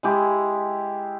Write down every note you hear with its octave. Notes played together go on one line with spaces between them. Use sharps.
G#3 E4 G4